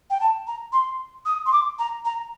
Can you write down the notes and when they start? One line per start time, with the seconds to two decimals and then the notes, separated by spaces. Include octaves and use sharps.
0.10 G5
0.20 A5
0.47 A#5
0.72 C6
1.26 D#6
1.46 C6
1.52 D6
1.79 A#5
2.05 A#5